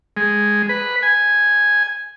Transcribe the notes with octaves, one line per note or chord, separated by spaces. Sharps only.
G#3
B4
G#5